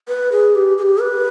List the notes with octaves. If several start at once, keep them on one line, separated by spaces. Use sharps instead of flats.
B4
G#4
G4
G#4
G4
B4